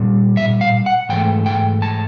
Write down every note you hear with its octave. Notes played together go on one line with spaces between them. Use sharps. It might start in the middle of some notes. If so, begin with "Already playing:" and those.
Already playing: A#2 G3
E5
F5
F#5
G#2 E3 A3 G5
G5
A5